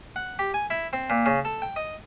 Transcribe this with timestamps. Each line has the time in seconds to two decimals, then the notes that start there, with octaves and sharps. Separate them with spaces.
0.16 F#5
0.39 G4
0.54 G#5
0.70 E4
0.93 C4
1.10 A#2
1.26 C#3
1.45 A4
1.62 G5
1.76 D#5